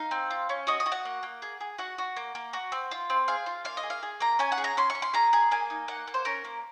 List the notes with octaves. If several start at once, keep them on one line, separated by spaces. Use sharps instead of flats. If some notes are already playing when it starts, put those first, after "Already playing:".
Already playing: D#4 F5
C4
F4
C#4
F#4 D#5
D#5
F#4
F#5
A#3
A#3
G#4
G#4
F#4 F#5
F#4
A#3
A#3
F#4
C4
F4
C4
G#4 F5
F4
A#3 F5
D#5
G#4
F5
G#4
A#3 A#5
C#4 G#5
F#5
G#4
A#5
C#4 C6
C#6
C#4
C6
G#4 A#5
G#4
A#3 G#5
D#4
A#3 F#5
A#3
C5
C#4 A#4
A#3